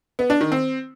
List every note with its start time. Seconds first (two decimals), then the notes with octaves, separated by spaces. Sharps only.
0.19 B3
0.30 D4
0.41 D#3
0.52 C4